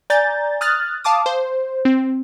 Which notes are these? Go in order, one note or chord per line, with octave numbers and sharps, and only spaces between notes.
D5 G#5 A#5 G6 A6
D#6 F6 F#6 A6
F5 A5 D6 D#6
C5
C4